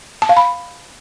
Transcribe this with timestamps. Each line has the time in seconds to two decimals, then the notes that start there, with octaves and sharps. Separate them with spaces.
0.22 A5
0.29 F5
0.37 B5